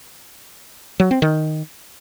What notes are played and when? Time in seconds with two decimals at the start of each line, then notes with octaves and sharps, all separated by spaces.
1.00 F#3
1.11 C4
1.22 D#3